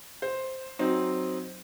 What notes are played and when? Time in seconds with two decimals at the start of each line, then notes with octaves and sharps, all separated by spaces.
0.22 C5
0.79 F#3 C4 D#4